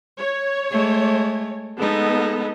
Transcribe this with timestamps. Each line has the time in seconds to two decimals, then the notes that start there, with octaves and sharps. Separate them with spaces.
0.18 C#5
0.71 G#3 A3
1.79 G#3 B3 D#4 A4